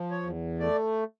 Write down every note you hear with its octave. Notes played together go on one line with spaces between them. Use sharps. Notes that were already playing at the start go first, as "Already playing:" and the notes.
Already playing: F3
C#5
E2
A3 D5